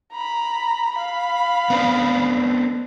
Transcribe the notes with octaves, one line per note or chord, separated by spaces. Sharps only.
A#5 B5
F5 B5
B3 C4 D4